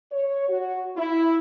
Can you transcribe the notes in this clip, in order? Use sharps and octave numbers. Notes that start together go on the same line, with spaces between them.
C#5
F#4
E4